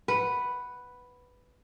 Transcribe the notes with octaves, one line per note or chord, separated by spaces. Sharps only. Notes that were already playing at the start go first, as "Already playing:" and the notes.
B4 F#5